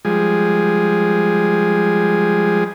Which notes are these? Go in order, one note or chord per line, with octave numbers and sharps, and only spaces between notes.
F3 G3 G#3 G#4